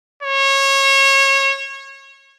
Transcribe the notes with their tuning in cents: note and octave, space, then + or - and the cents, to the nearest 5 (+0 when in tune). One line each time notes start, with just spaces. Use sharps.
C#5 -25